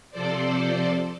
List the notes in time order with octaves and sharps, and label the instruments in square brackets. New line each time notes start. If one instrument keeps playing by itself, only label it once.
[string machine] C3 F3 A4 C5 D5